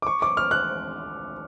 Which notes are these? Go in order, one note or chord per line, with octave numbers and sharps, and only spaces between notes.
D6
C#6
D6
F6
F#6